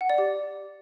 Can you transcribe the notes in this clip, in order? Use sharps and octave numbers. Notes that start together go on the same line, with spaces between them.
F#5
D5
G4